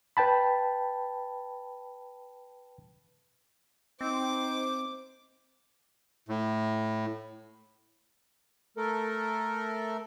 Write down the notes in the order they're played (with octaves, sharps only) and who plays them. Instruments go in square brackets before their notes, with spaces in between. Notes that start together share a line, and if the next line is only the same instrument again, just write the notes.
[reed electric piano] B4 G5 A5 B5
[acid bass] C4 [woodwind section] D#4 C5 [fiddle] D6
[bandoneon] A2
[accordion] A3 A4 A#4